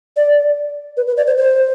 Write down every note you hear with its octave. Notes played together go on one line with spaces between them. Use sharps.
D5
B4
B4
D5
C5
C5